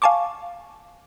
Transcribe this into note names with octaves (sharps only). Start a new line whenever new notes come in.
F5 G#5 A5 C#6 D6